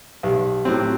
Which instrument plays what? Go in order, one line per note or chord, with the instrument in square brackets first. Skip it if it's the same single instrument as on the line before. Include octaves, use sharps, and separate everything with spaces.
[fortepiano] B1 [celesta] G4
[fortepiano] A2 F#3 C4